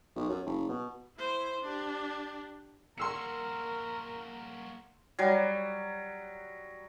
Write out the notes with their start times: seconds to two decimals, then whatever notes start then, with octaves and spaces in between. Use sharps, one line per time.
0.16 B1
0.29 F#2
0.46 F#1
0.69 B2
1.18 E4 C5
1.61 D4 G4
2.98 A#3 F#4 A#4 C6 E6 C#7
5.19 F#3 G3